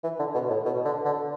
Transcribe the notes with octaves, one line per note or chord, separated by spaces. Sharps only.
E3
D3
B2
A2
B2
D3
D3